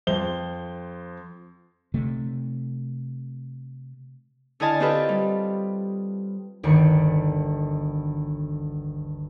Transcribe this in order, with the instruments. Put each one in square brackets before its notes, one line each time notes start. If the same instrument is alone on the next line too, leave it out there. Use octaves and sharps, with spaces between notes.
[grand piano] F2 C5 G7
[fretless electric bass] C3 A3
[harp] D3 E4 D#5 G#5 A5 F6
C4 F4 G4 A4 B4
G3
G1 D2 D3 D#3 C#7